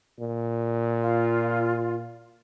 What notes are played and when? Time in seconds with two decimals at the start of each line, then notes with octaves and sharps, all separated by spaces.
0.20 A#2
1.00 F4